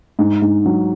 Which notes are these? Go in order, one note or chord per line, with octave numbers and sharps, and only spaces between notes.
G#2
G#2
F#3